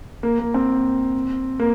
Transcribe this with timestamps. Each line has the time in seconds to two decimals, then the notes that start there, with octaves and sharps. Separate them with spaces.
0.23 A#3
0.39 A#3
0.54 C4
1.60 A#3